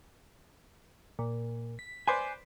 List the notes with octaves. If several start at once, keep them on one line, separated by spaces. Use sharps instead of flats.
A#2
B6
B4 C5 D5 G#5